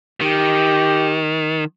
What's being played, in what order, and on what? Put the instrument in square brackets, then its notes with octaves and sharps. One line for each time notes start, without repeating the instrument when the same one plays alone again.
[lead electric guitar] D#3 [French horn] G4